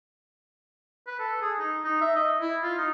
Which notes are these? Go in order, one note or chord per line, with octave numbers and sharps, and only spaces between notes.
B4
A4
G#4
D#4
D#4
E5
D#5
E4
F4
D#4